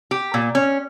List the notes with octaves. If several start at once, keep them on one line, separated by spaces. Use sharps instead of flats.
G4
A#2
C#4